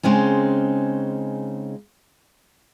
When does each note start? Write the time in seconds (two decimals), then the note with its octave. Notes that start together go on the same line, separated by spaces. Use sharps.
0.03 C#3 G#3 C4 C#4 D#4